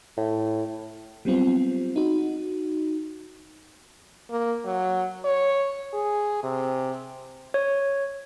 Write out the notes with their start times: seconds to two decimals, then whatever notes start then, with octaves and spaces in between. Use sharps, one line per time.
0.17 A2
1.25 F#3 G3 B3 C4 F4
1.96 D#4 F#4
4.30 A#3
4.65 F#3
5.25 C#5
5.94 G#4
6.43 C3
7.54 C#5